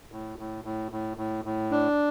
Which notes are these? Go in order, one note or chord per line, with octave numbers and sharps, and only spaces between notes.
A2
A2
A2
A2
A2
A2
D4